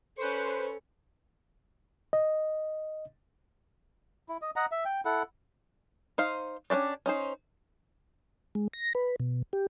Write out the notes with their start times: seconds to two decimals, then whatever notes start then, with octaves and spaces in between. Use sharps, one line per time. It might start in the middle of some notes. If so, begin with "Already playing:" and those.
0.17 C#4 A4 B4 C5 C#6
2.13 D#5
4.29 E4
4.42 D#5
4.56 D#5 F#5 A#5
4.72 E5
4.85 G5
5.05 E4 A4 F#5
6.18 D#4 C5 F5
6.70 C#4 D4 G4 D5
7.06 C#4 D#4 C5
8.55 G#3
8.74 A#6
8.95 B4
9.20 B2
9.53 G4